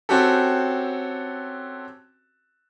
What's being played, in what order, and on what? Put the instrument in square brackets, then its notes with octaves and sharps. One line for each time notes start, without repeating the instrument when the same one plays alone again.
[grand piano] C4 C#4 F#4 G4 A4